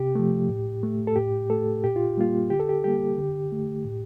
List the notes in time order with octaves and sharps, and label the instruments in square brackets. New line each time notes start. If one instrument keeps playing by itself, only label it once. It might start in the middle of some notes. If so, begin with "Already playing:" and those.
Already playing: [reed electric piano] C3 G4
F3 A3
A2
A3
A4
A2 G4
A3 A4
A#2 G4
F4
G3 A#3 F4
D3 G4
A4
G4
G3 A#3 G4
D3
A3
A2